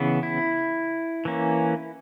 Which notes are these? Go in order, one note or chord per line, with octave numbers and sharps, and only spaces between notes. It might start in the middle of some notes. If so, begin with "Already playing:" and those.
Already playing: C#3 E3 B3
E4
E3 A#3 C#4